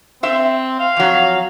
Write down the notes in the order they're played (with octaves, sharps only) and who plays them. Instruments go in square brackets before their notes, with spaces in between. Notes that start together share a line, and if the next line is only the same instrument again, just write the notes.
[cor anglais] C4 [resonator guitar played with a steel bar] C5 E5
[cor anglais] F5
[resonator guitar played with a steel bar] F2 F#3